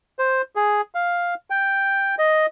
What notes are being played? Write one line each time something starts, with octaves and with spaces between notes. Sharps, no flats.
C5
G#4
F5
G5
D#5